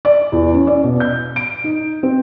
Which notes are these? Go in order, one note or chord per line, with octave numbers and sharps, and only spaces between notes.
D5
E2
C#4
D5
B2
G6
D7
D#4
C4